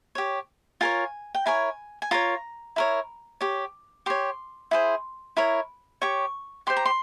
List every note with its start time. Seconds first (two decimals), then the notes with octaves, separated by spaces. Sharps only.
0.15 G4 C#5
0.81 F4 A#4 C#5 G#5
1.35 G5
1.46 E4 A#4 C#5 G#5
2.02 G#5
2.11 F4 A#4 C#5 A#5
2.76 E4 A#4 C#5
3.41 G4 C#5
4.06 G4 C#5 C6
4.71 E4 G#4 C5
5.37 E4 A#4 C#5
6.02 G4 C#5 C#6
6.67 G4 C5 C6
6.77 A#5
6.86 C6